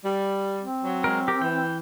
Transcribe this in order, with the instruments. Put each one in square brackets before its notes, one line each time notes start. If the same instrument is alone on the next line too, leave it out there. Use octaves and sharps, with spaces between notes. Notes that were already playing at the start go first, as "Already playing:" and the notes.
[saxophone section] G3
[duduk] C4
[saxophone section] F#3
[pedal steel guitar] G#3 A#4
G4 A#4
[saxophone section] E3 [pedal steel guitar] G5